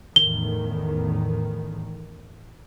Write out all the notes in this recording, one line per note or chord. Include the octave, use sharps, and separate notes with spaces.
E2 A2 D#3 G7